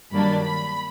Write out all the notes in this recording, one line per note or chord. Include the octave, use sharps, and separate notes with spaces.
G2 D#3 F#3 A#3 D4 B5
B5